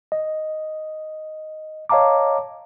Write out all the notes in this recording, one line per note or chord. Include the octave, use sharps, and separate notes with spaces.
D#5
C#5 D#5 F5 A5 A#5 D6